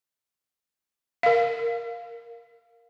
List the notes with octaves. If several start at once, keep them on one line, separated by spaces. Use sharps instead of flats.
A#4 F5